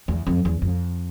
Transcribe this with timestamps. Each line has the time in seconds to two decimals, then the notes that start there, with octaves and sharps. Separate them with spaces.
0.08 E2
0.27 F2
0.45 E2
0.62 F2